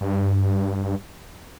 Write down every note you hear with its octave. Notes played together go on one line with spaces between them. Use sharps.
G2